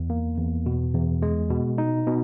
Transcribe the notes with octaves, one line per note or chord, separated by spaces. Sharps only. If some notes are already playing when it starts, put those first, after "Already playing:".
Already playing: E2
A#3
E2
B2
E2
G#3
B2
D#4
B2